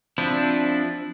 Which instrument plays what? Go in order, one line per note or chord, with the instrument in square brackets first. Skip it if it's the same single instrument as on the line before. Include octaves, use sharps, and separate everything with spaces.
[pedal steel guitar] F3 C4 D4 E4